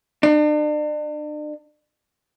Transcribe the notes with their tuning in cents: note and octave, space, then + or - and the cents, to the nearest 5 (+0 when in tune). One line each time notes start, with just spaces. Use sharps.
D4 +40